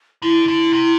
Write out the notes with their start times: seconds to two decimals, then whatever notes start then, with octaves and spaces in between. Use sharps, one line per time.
0.22 D3 E4
0.48 D3
0.73 C3